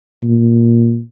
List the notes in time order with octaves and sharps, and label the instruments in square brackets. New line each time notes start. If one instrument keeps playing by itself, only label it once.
[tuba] A#2